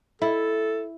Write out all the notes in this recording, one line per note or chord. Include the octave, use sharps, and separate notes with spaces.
E4 A4